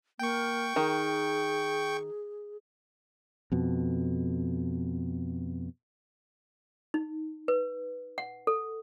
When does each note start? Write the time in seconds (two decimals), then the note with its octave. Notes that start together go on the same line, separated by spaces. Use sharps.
0.19 A#3 G5 C#6
0.76 D#3 G#4
3.52 F2 B2
6.94 D#4
7.48 B4
8.18 F#5
8.47 A4